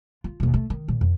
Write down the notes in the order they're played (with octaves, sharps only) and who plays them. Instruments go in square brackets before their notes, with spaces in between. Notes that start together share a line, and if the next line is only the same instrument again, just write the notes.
[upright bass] F4
D#2 B2
A3
D#3
A#2
F2